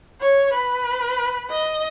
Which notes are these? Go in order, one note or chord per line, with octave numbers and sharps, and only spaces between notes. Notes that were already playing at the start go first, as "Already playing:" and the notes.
C#5
B4
D#5